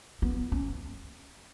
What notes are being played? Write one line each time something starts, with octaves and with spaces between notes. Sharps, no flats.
B3
C#4